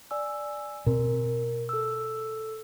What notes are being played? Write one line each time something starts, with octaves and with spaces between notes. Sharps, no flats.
D5 G#5 E6
B2 C4 A#4
A4 E6